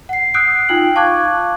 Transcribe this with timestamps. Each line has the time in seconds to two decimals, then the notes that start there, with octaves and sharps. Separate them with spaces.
0.09 F#5 C7
0.34 D#6 E6 F#6 G6 C7 D7
0.69 D#4 F4 G5 F6 F#7
0.95 F5 A5 C#6 D6 F#6 G#6